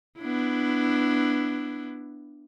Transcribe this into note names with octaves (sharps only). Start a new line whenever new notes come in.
B3 D4 E4